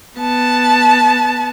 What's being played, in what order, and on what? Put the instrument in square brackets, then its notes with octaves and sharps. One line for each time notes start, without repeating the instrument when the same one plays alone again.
[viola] B3 A5